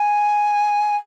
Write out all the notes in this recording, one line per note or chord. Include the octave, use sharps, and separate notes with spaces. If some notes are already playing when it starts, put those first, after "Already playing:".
Already playing: G#5